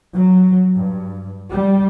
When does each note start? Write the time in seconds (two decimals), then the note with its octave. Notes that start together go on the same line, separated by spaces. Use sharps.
0.15 F#3
0.75 G2
1.52 G3